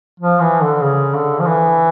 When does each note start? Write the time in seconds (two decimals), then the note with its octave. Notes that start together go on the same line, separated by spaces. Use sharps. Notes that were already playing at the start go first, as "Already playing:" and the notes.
0.20 F3
0.40 E3
0.62 D3
0.83 C#3
1.14 D3
1.39 F3
1.46 E3